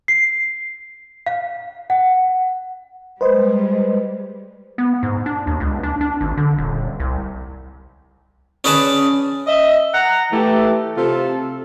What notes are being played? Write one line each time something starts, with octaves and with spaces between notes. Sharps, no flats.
C7
F5
F#5
G3 G#3 B4 C5 D#5
B3
G#2
D4
D#2
C#2
D4
D4
G#1
D3
D#1
C2
C#4 G#4 B4 D5 A5
D#5 E5
F#5 A#5
E3 A3 E4 G4
C3 F4 A4